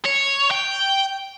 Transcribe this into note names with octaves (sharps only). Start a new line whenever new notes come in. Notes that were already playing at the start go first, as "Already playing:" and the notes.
C#5
G5